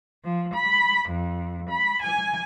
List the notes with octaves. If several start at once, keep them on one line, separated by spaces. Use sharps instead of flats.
F3
B5
F2
B5
G#5